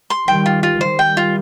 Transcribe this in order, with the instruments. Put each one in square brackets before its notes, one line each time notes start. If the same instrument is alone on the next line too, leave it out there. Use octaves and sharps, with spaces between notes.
[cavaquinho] C6
[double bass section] D#3 G3 [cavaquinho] G5
[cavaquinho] F4
F4
[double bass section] D#3 G3 [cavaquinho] C5
[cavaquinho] G5
F4